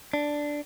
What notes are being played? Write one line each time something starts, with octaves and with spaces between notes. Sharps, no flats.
D4